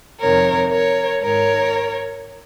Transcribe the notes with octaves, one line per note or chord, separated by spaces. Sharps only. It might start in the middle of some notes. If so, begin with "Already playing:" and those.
F2 C3 D#3 A#4 C#5
A#4 C#5
G#2 D#3 A#4 C#5